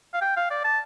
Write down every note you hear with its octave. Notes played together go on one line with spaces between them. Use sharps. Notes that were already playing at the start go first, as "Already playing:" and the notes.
F5
G5
F5
D5
A5